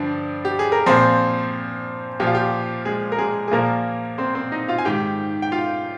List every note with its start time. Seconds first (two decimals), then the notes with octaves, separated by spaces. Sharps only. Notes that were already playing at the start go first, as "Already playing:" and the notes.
Already playing: G2 D3 F3 D4
0.45 G4
0.59 G#4
0.72 A#4
0.86 A#2 F3 C4 C5
2.20 A#2 F3 G4
2.27 F4
2.35 G4
2.85 G#3 G#4
3.12 A#4
3.18 G#3 G#4
3.48 G#4
3.52 A#2 F3 A#3 A#4
4.18 C4 C5
4.35 C4 C5
4.52 D#4 D#5
4.68 F4 F5
4.78 G#5
4.85 G#2 D#3 G4 G5
5.42 G5
5.52 F4 F5